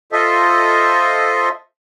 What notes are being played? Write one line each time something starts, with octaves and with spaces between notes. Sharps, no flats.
F4 A4 C5 D#5 E5